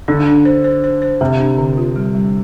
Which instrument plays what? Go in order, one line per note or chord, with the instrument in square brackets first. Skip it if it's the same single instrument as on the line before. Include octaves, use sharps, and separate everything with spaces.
[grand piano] D3 [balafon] D4
[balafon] D4
C5
C5
C5
C5
[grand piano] C3 [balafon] G4
[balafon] D4
D3
F4
G3
G3